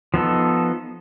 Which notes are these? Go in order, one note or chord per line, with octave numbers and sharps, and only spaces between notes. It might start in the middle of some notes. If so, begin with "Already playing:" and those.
F3 B3 D#4 A4